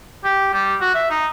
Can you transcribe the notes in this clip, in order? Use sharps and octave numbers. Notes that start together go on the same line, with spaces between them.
G4
G3
F#4
E5
D#4